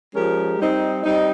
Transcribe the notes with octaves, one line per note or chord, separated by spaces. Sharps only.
F3 G#3 C#4 G4 A#4
G3 C4 D#4
G3 C4 D#4